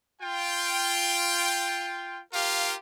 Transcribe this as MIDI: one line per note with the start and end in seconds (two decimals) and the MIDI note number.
0.22 2.21 65
0.22 2.21 79
2.34 2.75 65
2.34 2.75 67
2.34 2.75 70
2.34 2.75 77